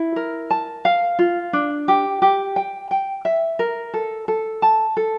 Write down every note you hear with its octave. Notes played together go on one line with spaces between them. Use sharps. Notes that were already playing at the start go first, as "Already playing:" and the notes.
Already playing: E4
A#4
A5
F5
F4
D4
G4
G4
G5
G5
E5
A#4
A4
A4
A5
A4